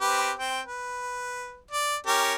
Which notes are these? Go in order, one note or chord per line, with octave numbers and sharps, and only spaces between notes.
C4 G4 B4
C4 G5
B4
D5
C#4 G4 A#4